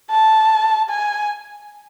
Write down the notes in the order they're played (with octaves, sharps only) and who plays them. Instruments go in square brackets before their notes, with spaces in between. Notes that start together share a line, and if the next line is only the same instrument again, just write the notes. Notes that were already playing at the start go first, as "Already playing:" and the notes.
[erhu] A5
G#5